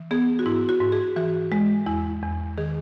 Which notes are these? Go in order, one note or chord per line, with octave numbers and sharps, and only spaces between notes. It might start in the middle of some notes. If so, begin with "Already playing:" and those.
Already playing: E3
B3 G#4
F#4
G#2 E4
F#4
G#2
G#4
E3 F#4
G#3
E2 E4
E2
D#3 G#4